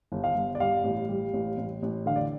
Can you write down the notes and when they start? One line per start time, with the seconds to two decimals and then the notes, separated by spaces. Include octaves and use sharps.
0.12 G1
0.24 F5
0.35 G1
0.55 D5
0.60 G3 F5
0.84 A1
1.09 G3
1.33 A1
1.58 A1
1.83 A1
2.06 D3 F5
2.16 D5